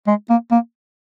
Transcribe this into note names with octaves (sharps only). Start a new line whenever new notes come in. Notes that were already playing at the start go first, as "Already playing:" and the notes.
G#3
A#3
A#3